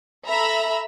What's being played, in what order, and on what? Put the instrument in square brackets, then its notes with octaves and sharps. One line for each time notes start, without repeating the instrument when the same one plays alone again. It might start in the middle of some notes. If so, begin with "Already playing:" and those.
[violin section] A4 E5 A#5 B5 E6